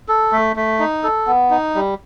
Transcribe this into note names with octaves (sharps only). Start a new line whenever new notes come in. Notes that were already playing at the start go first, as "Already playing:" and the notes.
A4
A3
A3
D#4
A4
B3
D#4
G3